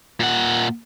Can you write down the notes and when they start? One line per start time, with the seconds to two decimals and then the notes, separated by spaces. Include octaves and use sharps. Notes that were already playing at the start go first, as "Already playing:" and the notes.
0.20 A#2 F#5